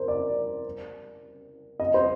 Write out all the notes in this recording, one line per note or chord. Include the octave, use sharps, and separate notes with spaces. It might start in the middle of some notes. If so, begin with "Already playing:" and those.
Already playing: A#4 C5
D5
D#5
C5